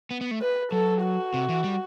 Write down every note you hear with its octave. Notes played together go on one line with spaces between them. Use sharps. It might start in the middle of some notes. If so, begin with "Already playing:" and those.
B3
B3
A3
B4
F#3 A4
F#4
C3
E3
G3